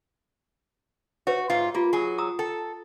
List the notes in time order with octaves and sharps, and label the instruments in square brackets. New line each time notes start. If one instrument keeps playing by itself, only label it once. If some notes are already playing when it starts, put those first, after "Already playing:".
[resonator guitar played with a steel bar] F#4 [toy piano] B4 C#5
[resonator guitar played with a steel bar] G#2 F4
[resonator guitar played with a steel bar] A#3 [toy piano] F4 G4
[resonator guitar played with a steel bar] F#3 G#4
[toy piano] A#5 D#6 E6
[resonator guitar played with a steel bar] A4 [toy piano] G5